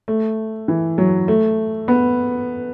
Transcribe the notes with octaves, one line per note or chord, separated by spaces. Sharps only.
A3
E3
F#3
A3
B3